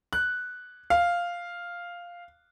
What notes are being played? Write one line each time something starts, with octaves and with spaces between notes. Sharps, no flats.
F#6
F5